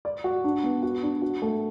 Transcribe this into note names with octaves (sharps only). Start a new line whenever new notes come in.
D5
F#4
D4
B3
F#4
D4
F#4
A3